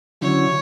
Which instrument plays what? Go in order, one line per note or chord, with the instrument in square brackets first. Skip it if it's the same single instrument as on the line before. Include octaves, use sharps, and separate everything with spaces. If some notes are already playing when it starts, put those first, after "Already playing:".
[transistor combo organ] D3 F#3 C#4 E4 [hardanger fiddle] C#5